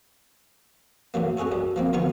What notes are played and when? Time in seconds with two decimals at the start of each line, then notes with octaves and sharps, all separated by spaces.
1.14 A2 E3 F#3 A#3
1.37 C#4 F#4 G#4 A4 C#5
1.52 F#2 G3
1.76 F3 A#3 C4
1.93 D2 D#3 F3 B3 D#4 C#6